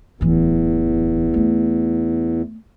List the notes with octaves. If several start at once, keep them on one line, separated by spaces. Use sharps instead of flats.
D1 E2 E3
A3 B3